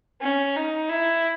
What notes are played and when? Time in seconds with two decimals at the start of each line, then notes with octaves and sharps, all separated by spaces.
0.21 C#4
0.56 D#4
0.89 E4